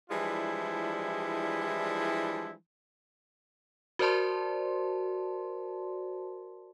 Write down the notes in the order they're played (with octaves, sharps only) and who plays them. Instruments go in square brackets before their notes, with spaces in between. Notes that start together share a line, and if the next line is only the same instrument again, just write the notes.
[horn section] E3 F3 G3 G#3 D4 E4
[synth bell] F#4 A#4 C5 D5 A5 C6